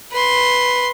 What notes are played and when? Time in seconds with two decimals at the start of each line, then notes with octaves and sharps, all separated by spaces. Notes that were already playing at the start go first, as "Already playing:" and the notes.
0.12 B4 C6